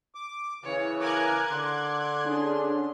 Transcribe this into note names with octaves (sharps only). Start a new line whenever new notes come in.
D6
C#3 E3 C#5
A#4 G#5 D6 F#6 G#6
D3 C6
C#4 D4 G#4